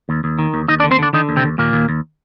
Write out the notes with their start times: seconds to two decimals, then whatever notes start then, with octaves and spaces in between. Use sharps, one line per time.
0.09 D#2
0.24 D#2
0.39 D#3
0.54 D#2
0.68 D#2 D#4 D#5
0.80 D4 D5
0.84 D3
0.91 C4 C5
0.99 D3 D4 D5
1.13 D3 D#3 D#4
1.29 D#2
1.36 C3 C4
1.43 D#2
1.58 D#2 A#2 A#3
1.73 D#2
1.89 D#2